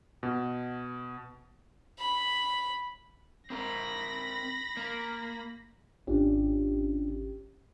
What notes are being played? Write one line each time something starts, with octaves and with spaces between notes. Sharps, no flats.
B2
B5
C4 A#4 B5 A#6
A#3
G#1 C#4 D4 F4 G4